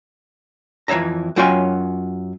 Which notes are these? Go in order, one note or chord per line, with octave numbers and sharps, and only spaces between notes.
F2 E3 C#5 E5 A#5
F#2 F#3 F4 C#5 G5 G#5